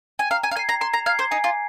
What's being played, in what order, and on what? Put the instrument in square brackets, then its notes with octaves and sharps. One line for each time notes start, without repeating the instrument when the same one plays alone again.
[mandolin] G#5
[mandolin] F5 [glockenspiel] A#5
[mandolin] G#5
F5
[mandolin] G#5 [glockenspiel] G#6
[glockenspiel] C7
[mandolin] A#5
[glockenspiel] A#5 [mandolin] C6
[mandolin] A#5
[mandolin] F5 [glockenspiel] G#6 C7
[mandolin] C5
[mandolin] D#4 [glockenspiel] G#5
[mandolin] F4